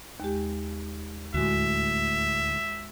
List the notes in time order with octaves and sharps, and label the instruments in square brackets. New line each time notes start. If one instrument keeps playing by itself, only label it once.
[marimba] D#2 G#3 G4
[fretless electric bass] D2 A2 [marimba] G#3 F#4 [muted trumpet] E5